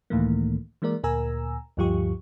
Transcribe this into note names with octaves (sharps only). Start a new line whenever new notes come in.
C#2 A2 D#3 E3 A3 A#3
E3 G#3 A#3 A#4 D5
D2 A#2 A#4 G#5 A#5 E6
D2 G2 F3 F4 G4 C#6